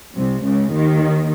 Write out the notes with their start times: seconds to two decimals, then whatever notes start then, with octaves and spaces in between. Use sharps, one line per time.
0.15 C2 C3
0.44 C#2 C#3
0.72 D#2 D#3